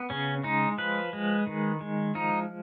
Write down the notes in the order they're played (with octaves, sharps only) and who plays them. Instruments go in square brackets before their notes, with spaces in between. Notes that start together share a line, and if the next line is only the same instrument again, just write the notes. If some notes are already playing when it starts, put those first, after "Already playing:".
Already playing: [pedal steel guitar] B3
C#3 C#4
G#3 D#4
F3 B4
G#3
D#3
G#3
F3 D#4